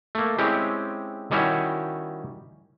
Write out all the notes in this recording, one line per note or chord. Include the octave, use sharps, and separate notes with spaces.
A3 A#3
G#3 C4 C#4 E4 G4
D#3 G3 C#4 E4 F#4 C#5